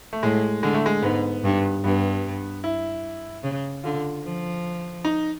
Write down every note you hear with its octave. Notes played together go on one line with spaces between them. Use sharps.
A3
A2 G#3
D3 G#3
A3
G#3
G#2 B3
G2
G2 B3
E4
C#3
D3 F4
F3
D#4